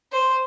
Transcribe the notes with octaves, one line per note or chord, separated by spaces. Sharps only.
C5